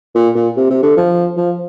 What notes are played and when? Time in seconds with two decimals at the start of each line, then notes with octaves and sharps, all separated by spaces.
0.15 A#2
0.35 A#2
0.56 C3
0.70 C3
0.83 D3
0.97 F3
1.37 F3